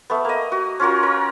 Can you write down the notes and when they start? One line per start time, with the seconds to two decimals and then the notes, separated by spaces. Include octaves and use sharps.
0.10 A3 B3
0.25 A#3 D#5
0.52 F#4
0.80 C#4 F4 F#4 A#4
1.03 A#4